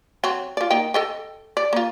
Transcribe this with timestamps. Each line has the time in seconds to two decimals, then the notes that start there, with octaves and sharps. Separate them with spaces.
0.24 F#3 C4
0.57 F4 D5
0.70 A#3 D#4 G5
0.94 A4 D#5 G5
1.57 D5
1.73 A#3 F4